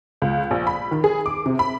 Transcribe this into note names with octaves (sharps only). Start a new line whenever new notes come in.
C#2
A#1
B5
D#3
G#4
D6
C3
B5